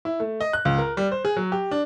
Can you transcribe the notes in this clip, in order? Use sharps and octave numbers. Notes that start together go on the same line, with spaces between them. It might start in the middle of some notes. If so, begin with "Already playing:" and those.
E4
A3
D#5
F#6
C#2
A#4
G3
C5
G#4
F#3
G4
D4